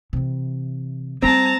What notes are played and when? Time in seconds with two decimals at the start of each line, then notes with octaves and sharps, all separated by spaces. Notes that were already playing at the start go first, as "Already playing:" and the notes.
0.13 C3 E3
1.22 G3 A3 C4 A5 A#5